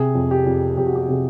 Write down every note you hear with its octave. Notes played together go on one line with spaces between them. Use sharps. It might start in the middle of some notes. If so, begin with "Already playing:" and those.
Already playing: C3 G#4
F2
G4
F2
F2 G4
F#4
G4
C3 G#4